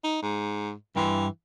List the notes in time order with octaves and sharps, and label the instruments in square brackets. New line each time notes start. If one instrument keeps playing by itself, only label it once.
[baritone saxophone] D#4
G#2
[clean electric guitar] G2 G5 C6 [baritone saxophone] E3